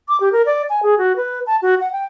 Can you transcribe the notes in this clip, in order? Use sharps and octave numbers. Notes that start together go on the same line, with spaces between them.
D6
G4
A#4
D5
G#5
G#4
F#4
B4
A5
F#4
F#5
G5